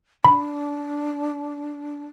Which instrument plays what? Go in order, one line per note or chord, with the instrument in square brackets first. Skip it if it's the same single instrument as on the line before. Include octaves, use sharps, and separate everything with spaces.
[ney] D4 [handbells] B5